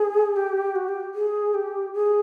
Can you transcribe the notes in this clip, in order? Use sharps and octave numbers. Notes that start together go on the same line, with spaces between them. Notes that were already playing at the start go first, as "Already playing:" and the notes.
Already playing: G#4
G4
F#4
G4
G#4
G4
G#4